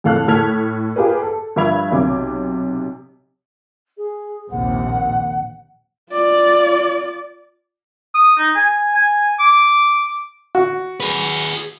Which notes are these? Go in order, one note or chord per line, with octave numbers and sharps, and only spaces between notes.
F2 A2 A4 F5 A5 F#6
A2 A4 F6 G#6 B6 F7
F4 G4 G#4 A#4 B4
A4
G2 F3 E5 B5 G#6 F7
B1 C3 D6
G#4
A#1 D#2 C3 F#5
F4 D5
D#6
D#4
G#5
G#5
D6
F#4
G#4 B4